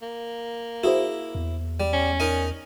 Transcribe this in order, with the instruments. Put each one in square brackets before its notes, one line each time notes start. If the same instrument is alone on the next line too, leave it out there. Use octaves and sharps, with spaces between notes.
[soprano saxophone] A#3
[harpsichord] E4 [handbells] F#4 G#4 C5
[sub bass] E2
[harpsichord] G3
[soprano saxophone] C#4
[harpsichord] D#4 A#4 D#5